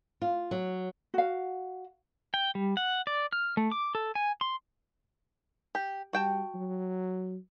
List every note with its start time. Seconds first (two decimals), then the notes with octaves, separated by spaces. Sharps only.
0.22 F4
0.51 F#3
1.14 F#4 F5
2.34 G5
2.55 G3
2.77 F#5
3.07 D5
3.33 F6
3.57 A3
3.72 D6
3.95 A4
4.15 G#5
4.41 C6
5.75 G4
6.13 G3 F#4 G5 A5
6.55 F#3